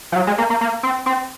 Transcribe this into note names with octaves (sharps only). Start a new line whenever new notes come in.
F3
F#3
G#3
A#3
A#3
A#3
C4
C4